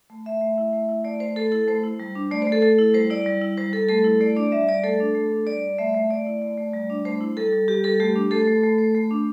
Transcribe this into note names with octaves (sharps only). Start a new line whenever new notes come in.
A3
A3 E5
A3
E4
A3
E4
A3 D5
A3 C5
A3 A4
E4 A4
A3 C5
E4
G3
D4
A3 D5
C5
A3
A4
A3 A4
E4
G3 C5
E4 D5
G3
E4
G3 C5
G3 A4
A3 A4
E4
A3 D5
D4 D5
G3 E5
G3 D5
A3 A4
D4
A3
D4
G3 D5
G3
A3 E5
A3
A3 D5
E4
A3
A3
G3
D4
A3 C5
E4
G3 A4
G3
G3 G4
G3 A4
A3 G4
D4
A3 A4
A3
A3
A3
A3
D4